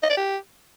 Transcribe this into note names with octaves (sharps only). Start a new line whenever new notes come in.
D#5
D5
G4